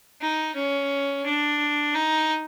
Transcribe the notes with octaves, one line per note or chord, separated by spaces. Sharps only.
D#4
C#4
D4
D#4